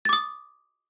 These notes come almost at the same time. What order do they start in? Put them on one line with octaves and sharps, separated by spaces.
A6 D6 D#6